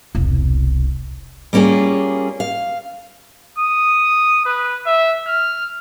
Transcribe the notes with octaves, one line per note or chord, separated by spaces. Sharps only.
E1 C2
G3 A#3 C#4 F4 G#4
F5
D#6
B4
E5
F6